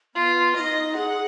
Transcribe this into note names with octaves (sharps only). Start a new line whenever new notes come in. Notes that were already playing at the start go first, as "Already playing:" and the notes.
B3 F4
D#4 F4 D#5
G#4 F#5